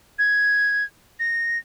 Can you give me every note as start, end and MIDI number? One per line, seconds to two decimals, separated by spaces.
0.19 0.84 92
1.20 1.58 94